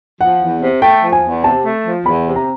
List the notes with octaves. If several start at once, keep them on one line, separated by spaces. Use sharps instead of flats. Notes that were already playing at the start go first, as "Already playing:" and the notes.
F3 F#5
E2
C3
A3 G5
F3
G#5
E2
C3 A5
A3
F3
E2 B5
C3
A#5